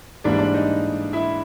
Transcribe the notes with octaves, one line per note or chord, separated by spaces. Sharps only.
G#2 E3 G3 A#3 D4 D5
D4 D5
D#4 D#5
E4 E5